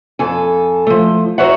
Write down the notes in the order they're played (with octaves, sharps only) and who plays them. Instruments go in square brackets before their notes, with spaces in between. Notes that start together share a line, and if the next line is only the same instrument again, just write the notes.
[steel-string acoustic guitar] F2 A4 G#5
F3 A3
D#4 F#4 C5 C#5 E5 F#5